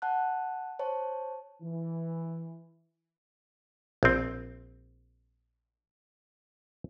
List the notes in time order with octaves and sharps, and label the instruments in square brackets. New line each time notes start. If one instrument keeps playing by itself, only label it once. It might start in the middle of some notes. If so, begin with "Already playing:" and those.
[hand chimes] F#5 A5 F#6
C5 C#5 A5
[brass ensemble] E3
[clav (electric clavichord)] A#1 C4